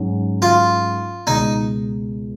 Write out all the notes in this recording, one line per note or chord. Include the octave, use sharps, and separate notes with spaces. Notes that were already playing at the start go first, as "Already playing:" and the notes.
Already playing: G#2 F#3 C#4 F#4
F4
C#2 B2 G#3 D#4